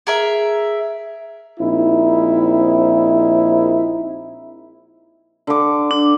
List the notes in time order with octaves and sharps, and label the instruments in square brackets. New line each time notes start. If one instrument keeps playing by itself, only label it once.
[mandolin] G#4 A#4 E5
[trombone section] A#1 C4 D#4 E4
[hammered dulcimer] D3 D6
[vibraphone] D4